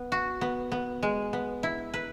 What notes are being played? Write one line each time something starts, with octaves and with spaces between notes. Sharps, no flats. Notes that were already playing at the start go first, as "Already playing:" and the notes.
Already playing: B3
F#4
B3
B3
G#3
B3
E4
B4